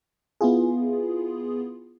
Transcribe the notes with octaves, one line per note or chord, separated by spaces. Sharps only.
B3 E4 F4 G#4